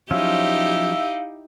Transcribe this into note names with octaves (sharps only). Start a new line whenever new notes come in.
F3 F#3 C#4 D#4 E4 G4 E5 F5